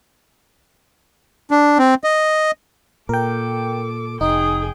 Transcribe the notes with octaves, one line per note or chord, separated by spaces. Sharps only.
D4
C4
D#5
A#2 A4 A#4 G5 D6
F1 D#4 G#4 G5 D#6